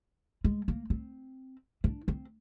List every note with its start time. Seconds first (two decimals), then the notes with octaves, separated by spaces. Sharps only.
0.44 G#3
0.68 A#3
0.90 C4
1.84 D4
2.08 C4